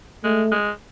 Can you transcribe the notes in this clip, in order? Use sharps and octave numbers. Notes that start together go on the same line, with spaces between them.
G#3 A3
G#3